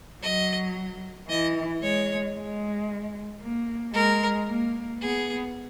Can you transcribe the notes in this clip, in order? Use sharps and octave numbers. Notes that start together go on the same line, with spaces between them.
F#3 D#5
E3 D#5
G#3 C#5
G#3
A#3
G#3 A#4
A#3
B3 G#4